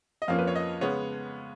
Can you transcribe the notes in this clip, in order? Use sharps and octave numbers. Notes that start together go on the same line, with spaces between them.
D#5
F2 F3 A#3 C#4 F5
B4
C#5
D#5
C#3 G#3 B3 C#5